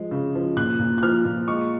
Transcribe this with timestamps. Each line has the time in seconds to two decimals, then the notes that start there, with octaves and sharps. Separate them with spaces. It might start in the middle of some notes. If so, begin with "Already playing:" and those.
Already playing: F3 G#3
0.11 C#3
0.35 F3
0.57 A#2 F#6
0.79 A#2
0.98 F#6
1.02 F3 F6
1.25 A#2
1.48 G#3 C#6